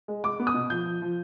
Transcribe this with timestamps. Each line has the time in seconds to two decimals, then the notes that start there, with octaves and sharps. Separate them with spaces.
0.08 G#3
0.24 G#3 D6
0.40 B3
0.47 D#6
0.54 B2
0.70 F3 G6
0.86 F3
1.02 F3